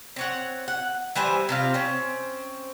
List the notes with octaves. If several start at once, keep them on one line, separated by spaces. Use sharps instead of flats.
C4 C#5 F#5
F#5
E3 G3 C5 G#5
C3 C4 F4
C4 C#4